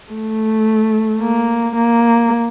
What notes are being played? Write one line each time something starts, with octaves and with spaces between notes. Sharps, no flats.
A3
A#3
A#3